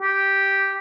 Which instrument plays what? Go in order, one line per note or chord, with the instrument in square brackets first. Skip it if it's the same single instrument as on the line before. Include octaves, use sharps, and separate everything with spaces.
[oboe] G4